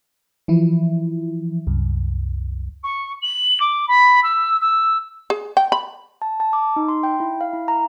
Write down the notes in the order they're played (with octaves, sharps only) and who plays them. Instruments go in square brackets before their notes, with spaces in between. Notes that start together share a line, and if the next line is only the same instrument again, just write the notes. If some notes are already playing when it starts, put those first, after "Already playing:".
[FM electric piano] E3 F3 E4
C2 F#2
[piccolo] C#6
F#7
D6
B5
E6
E6
[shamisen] G#4
G5
B5
[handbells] A5
A5
D6
D#4
C6
G5
E4
F5
E4
A#5